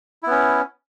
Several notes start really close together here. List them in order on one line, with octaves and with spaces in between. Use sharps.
E4 B3 C#4